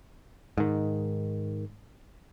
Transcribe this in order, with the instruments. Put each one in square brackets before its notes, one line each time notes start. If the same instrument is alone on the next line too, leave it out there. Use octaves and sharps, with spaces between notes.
[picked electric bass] G#2 D#3